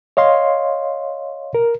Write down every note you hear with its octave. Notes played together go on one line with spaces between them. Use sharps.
C#5 D#5 F5 C6
A#4